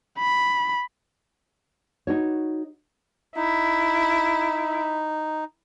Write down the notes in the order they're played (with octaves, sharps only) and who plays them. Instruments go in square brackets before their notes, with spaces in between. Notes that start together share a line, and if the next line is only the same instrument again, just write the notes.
[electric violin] B5
[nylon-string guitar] D#4 F#4 C#5
[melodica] D#4 [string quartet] E4